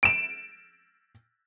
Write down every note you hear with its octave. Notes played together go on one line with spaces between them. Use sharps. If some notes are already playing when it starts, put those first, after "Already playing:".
D7 E7